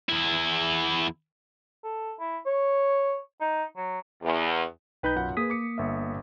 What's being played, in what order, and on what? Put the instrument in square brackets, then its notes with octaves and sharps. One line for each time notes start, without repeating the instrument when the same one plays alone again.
[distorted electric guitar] E2 E4
[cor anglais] A4
E4
C#5
D#4
F#3
[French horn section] E2
[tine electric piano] B1 B5 G6 [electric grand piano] D#4 B4 G5
[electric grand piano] F#2 F4 F#5
[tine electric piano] A#3 D#6 B6 [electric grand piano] G#4 B4
[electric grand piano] D6 C#7
G1 E5